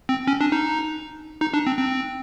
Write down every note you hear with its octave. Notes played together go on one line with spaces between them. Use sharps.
C4
C#4
D4
D#4
D#4
D4
C4
C4